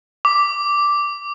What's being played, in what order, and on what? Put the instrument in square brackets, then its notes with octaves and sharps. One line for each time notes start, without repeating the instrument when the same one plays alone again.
[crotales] D6